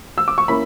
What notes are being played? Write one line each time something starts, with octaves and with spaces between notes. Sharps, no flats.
E6
D6
C#6
A#3 C#4 E4 B5